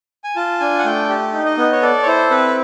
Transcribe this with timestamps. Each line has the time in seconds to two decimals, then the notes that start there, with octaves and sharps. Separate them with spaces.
0.24 G#5
0.36 F4 A5
0.60 D4 G#5
0.79 F#5
0.84 A3 G5
1.09 G4
1.33 D#4
1.46 D#5
1.58 B3
1.72 C#5
1.82 A4 D5
2.03 C#5
2.07 E4 C5
2.30 C4 B4